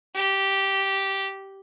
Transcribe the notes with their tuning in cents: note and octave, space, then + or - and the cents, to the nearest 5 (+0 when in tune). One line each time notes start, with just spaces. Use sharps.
G4 -10